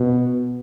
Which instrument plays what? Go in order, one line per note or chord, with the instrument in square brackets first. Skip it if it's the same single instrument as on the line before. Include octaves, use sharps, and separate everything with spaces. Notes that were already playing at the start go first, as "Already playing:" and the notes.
Already playing: [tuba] B2